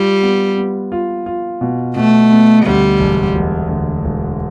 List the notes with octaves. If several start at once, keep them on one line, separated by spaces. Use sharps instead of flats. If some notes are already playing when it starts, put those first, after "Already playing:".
Already playing: G3 F4
B3
B3
F4
F4
B2
B2 A3
B3
D2 G3
E1
E1
D2
E1